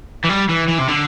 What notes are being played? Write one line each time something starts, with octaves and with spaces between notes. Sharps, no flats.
E3
G3
E3
E3
C3
D3